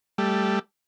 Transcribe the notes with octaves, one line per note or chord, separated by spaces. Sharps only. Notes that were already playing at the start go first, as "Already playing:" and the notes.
G3 A3